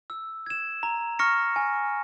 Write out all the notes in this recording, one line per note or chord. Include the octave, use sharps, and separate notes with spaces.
E6
G#6 E7
A#5
C#6 F6 A#6 C#7
G#5